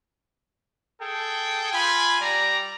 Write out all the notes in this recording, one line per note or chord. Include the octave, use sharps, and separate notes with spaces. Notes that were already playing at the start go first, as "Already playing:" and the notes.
G#4 A4 G5
F4 G#5 B5
G3 D5 A#5